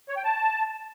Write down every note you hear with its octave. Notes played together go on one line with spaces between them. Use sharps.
C#5
G5
A5